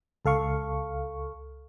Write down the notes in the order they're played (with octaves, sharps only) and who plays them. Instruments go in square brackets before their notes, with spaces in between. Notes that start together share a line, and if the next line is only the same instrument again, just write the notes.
[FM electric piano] C#2 A4 F5 C#6